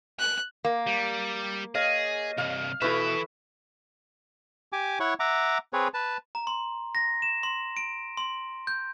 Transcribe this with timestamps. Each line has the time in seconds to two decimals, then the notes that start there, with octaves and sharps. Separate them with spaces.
0.19 F#6
0.65 A#3
0.87 G3
1.75 G#4 C#5 D#5 F5 A#6
2.38 C2 G2 F5
2.82 B2 E3 E4 A4 B4 E5 B6
4.73 G4 G#5 D6
5.00 E4 C#5 F#5 C#6
5.20 E5 F#5 A#5 D6
5.73 C4 G#4 B4 C#5
5.94 B4 A5
6.35 A#5
6.47 C6
6.95 A#6
7.22 E7
7.43 C6
7.77 D7
8.17 C6
8.67 G6